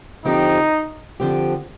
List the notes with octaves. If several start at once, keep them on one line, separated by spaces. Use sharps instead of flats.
D3 F3 C4 D#4 G4
D3 F3 C4 G4